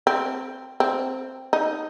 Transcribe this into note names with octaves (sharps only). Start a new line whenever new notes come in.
C4
C4
D#4